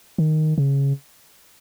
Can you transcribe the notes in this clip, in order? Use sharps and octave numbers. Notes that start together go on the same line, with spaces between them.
D#3
C#3